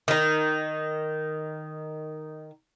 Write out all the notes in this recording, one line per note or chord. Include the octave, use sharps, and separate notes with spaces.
D#3 D#4